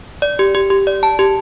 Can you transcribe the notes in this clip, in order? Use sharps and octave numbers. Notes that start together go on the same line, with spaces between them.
D5
G4
G4
G4
D5
A5
G4